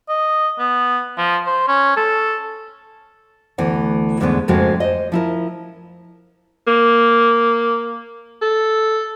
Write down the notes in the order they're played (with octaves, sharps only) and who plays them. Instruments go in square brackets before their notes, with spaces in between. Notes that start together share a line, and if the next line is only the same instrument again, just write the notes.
[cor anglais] D#5
B3
F3
C5
C#4
A4
[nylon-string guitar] D2 E3 B3 F#5
E2 G#2 D3 G#3 A3 B3
F2 G#2 C#3 G#3 A#3 F#4
C5 D#5
F3 E4 A#4
[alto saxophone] A#3
A4